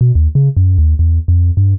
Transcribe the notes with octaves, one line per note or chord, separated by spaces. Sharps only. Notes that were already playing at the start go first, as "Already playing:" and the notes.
B2
D#2
C#3
F#2
D#2
E2
F2
G2